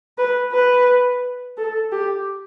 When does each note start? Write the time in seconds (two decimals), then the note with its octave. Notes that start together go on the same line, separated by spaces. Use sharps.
0.18 B4
0.52 B4
1.57 A4
1.92 G4